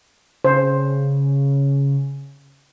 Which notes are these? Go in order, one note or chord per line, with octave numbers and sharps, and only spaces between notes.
C#3 C5